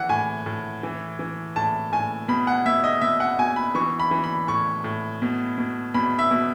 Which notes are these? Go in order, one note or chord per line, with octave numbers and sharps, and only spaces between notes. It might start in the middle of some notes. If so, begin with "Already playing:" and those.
Already playing: E3 F#5
A2 G#5
A2
E3
E3
A2 A5
A2 G#5
B2 B5
F#5
B2 E5
D#5
B2 E5
F#5
B2 G#5
B5
E3 C#6
B5
E3
B5
A2 C#6
A2
B2
B2
B2 B5
E5
B2